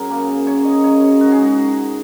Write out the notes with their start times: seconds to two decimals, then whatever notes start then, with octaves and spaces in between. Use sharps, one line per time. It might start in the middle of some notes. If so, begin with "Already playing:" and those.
Already playing: F#2 G#4 A#4
0.09 C#3 A#3
0.46 F#2 C#5
0.65 D#5
0.84 C#3 F#3 C#5
1.21 G#2 F#4
1.32 G#4
1.42 F#4